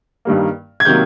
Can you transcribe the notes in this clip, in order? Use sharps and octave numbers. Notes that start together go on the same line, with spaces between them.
G2 D#3 G3 A#3
G#6
C3 D#3 F#3 A#3 G6